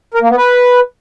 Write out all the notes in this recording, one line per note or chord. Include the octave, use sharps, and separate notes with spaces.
A#4
A#3
B3
B4